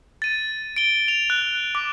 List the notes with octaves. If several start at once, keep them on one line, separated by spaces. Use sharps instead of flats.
A6 D#7
D7 G7
F7
F#6
D6